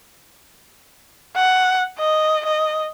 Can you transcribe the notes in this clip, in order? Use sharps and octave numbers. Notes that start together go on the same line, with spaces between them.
F#5
D#5
D#5